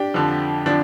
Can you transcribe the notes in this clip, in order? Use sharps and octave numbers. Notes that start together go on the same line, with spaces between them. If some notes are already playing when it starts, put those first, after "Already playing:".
Already playing: D4 G4
F2 D3 F3
D3 F3 D4